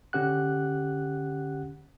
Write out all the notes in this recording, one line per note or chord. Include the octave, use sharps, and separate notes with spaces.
D3 C#4 G4 F#5 F#6